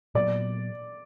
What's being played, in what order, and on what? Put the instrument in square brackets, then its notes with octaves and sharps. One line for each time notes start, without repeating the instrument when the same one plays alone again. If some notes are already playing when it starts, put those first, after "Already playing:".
[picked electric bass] A#2 F#3 B3 [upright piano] D5